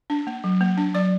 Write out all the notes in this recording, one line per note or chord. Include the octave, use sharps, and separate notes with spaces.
D4
A#3
F#3
A#3
D4
F#3 D5